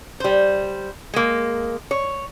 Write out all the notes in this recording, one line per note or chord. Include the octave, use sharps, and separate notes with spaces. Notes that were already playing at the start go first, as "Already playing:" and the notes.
G3 C5
G#3 A#3
C#5